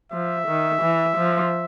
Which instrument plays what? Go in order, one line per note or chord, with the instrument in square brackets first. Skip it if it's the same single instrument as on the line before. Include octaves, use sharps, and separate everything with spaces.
[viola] F3 [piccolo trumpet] E5
[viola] D#3
E3
F3